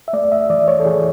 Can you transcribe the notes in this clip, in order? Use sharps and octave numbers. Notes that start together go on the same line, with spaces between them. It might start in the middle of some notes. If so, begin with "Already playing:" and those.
E5
A3 D5
E5
E3 D5
C#5
A4
E3 G#4